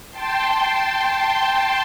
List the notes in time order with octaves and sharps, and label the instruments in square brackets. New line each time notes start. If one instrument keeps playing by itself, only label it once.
[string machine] G5 A5 C6